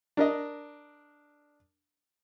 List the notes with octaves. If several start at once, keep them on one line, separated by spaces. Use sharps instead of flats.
D4 A#4 D#5